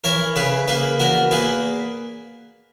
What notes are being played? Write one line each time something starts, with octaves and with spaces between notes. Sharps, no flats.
E3 A#4 C#5
C#3 G#4 B4
A#3 G#4 B4
E2 F#4 A#4
A#3 G#4 B4